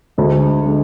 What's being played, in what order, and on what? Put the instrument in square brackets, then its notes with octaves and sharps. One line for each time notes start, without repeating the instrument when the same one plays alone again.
[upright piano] D2 D3 G#3
D3 G#3